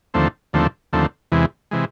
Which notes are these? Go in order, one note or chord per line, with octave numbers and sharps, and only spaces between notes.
D#2 D3 F3 A3 C4
D#2 D3 F3 A3 C4
D#2 D3 F3 A3 C4
E2 C3 E3 G#3
C3 E3 G#3